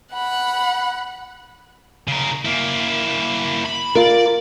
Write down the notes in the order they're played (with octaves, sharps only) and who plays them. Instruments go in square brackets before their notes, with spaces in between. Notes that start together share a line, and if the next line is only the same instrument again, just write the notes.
[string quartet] F#5 B5
[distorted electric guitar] C#3 A#4
A#3 E4
B5
[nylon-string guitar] F4 A#4 [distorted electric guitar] D5